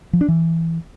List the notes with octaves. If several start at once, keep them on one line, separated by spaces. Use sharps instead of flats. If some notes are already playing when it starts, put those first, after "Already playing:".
F3
D4
E3